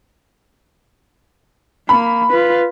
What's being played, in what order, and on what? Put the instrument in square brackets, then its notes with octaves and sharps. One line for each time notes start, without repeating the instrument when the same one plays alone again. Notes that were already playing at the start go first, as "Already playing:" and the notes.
[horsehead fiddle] A#3 [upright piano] B5
[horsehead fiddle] F4 B4